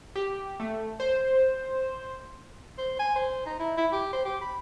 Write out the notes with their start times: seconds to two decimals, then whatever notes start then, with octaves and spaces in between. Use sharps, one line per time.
0.16 G4
0.60 A3
1.00 C5
2.78 C5
2.99 G#5
3.16 C5
3.46 D#4
3.59 E4
3.77 E4
3.92 G4
4.12 C5
4.25 G4
4.41 B5